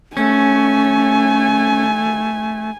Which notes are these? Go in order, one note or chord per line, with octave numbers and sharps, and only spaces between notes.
A3 C#4 G#5